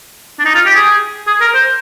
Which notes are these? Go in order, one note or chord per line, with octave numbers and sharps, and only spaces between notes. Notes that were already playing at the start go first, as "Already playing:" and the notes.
D4
D#4
F4
G4
G#4
G#4
A#4
C5